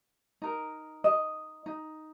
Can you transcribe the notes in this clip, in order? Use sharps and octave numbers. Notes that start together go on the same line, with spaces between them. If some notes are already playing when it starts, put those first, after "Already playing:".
D#4 A#4
D#5
D#4